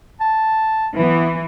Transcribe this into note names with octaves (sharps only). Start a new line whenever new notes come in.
A5
E3 B3